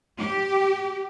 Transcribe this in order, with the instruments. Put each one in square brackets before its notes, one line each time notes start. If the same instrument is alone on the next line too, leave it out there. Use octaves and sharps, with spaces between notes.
[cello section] G4